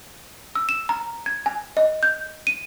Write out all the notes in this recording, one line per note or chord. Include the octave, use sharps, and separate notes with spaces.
E6
E7
A#5
G#6
G#5
D#5
G6
D#7